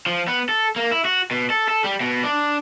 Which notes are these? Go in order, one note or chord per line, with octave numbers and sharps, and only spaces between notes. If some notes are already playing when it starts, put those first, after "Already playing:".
F3
B3
A4
A#3
E4
F#4
B2
A4
A4
G3
B2
D4